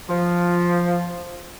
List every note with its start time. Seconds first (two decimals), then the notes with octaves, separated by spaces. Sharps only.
0.09 F3